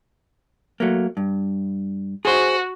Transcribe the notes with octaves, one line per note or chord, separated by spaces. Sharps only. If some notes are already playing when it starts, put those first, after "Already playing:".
F#3 A3 A#3
G2
F#4 G#4 C5